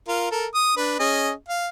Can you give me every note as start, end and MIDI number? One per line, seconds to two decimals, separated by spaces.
0.08 0.30 65
0.08 0.30 70
0.31 0.46 69
0.31 0.46 70
0.54 0.75 87
0.77 0.95 62
0.77 0.95 71
0.99 1.31 61
0.99 1.31 68
0.99 1.31 75
1.49 1.69 77